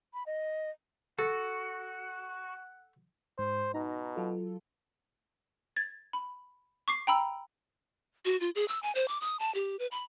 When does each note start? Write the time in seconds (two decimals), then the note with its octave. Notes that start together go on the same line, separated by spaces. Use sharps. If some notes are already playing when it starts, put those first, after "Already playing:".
0.14 B5
0.27 D#5
1.19 F#4 A4 F#5
3.39 G#2 C5
3.74 B2 D#4 A#5
4.16 F#3 F4 A4
5.76 G#6 A6
6.13 B5
6.88 C#6 D6 C7
7.07 G5 A#5 B5 E6
8.25 F#4
8.40 F4
8.55 G#4
8.68 E6
8.83 G#5
8.95 C5
9.08 D6
9.21 D#6
9.40 A5
9.54 G4
9.79 B4
9.91 B5